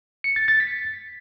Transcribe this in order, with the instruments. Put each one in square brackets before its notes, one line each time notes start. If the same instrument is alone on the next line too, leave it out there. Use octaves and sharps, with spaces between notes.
[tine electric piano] C#7
A6
A6
B6